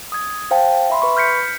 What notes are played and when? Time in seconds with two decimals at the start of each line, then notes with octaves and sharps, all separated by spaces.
0.12 D#6 G#6
0.51 C5 F5 G5 A5
0.90 E5 B5 C6
1.02 B4 B5 C#6
1.17 F6 G6 B6 C#7